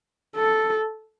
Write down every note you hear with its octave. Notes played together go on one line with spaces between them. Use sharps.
A4